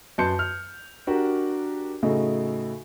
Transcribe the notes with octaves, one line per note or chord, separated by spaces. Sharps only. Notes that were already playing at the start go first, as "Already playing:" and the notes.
F#2 B4 A5 C6 G6 C#7
F6
D4 F#4 G4 A#4
A2 C#3 A3 D#4 F#4